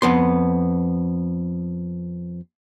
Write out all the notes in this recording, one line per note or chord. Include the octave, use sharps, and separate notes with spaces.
F2 B3 C6